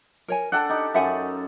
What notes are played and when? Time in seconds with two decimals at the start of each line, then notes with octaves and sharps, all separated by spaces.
0.28 A#4 C#5 G#5
0.52 D4 A4 F#5 G5 A5
0.69 D#4 G4
0.94 F#2 E5 F#5 G#5